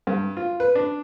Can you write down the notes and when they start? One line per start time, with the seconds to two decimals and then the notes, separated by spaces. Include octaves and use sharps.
0.07 G2
0.37 F4
0.60 B4
0.75 D4